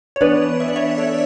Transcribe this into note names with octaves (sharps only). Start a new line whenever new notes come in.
C#5
E3 B3 D4 B4 D5
E5
D5
C#5 E5
A4 C#5